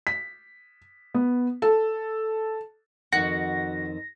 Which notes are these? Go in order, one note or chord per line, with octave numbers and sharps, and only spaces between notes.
B6
B3
A4
F2 D#3 F#4 A#6